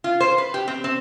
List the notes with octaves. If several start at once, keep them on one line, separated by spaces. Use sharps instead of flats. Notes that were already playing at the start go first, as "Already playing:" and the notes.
F4
C5
B4
G4
C4
C4